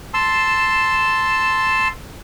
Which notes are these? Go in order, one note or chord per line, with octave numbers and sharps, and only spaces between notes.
A5 C6 E6